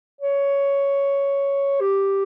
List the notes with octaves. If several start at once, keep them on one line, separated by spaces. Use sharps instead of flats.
C#5
G4